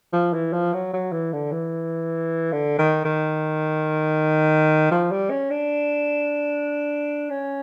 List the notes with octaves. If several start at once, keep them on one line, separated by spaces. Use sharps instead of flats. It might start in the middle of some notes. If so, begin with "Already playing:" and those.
F3
E3
F3
F#3
F#3
E3
D3
E3
D3
D#3
D#3
F3
G3
C#4
D4
C#4